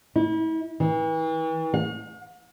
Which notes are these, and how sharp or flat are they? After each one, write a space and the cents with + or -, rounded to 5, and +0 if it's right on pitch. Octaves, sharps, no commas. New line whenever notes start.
E4 -35
E3 -35
F5 +45